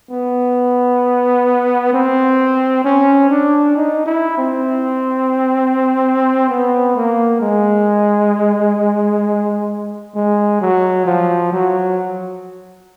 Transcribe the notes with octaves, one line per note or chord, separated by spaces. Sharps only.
B3
C4
C#4
D4
D#4
E4
C4
B3
A#3
G#3
G#3
F#3
F3
F#3